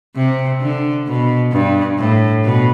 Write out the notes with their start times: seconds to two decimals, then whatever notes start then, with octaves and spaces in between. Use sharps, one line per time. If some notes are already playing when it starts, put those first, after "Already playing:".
0.16 C3
0.61 D3
1.07 B2
1.52 G2
1.98 A2
2.43 B2